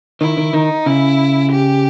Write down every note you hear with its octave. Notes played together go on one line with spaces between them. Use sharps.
D#3 E4
D#3
D#3 D#4
C#3 E4
G4